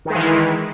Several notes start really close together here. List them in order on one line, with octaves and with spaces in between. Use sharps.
D#3 G#3 E3